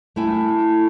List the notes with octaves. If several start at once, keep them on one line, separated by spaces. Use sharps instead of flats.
A3 E4 G#5